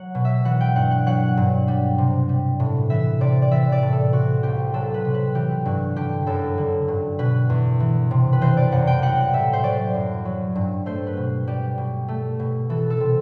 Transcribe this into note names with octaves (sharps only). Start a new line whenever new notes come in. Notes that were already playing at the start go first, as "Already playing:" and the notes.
Already playing: F#3 F#5
B2
E5
E3 F#5
G5
G2 F#5
F#5
F#3 F#5
G2
G3
C3
G3
A2
E3 E5
C3 D5
D5
E3 E5
D5
A2
A4
C3 F#4
C2 G4
F#3 A4
B4
C3
B4
E3 G4
G2 F#4
D3 G4
F#2 A4
D3
G2
B2 B4
E2
E3
C3
B4
E3 C5
D5
F#2 F#5
G5
G3 F#5
A2 E5
C5
F#3 D5
F#2
F#3
G2
A3 C5
B4
B2
G3 G4
B2
A3
B2
E3 A4
A4
C3